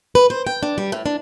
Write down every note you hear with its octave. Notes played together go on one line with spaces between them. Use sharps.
B4
C5
G5
D4
G3
A2
D4